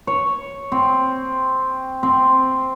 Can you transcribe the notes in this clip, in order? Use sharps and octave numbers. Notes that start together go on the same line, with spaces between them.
C#5
C4
C4